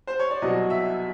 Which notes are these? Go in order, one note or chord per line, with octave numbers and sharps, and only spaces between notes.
C5
C#5
D5
C2 B2 F#3 D#5
E5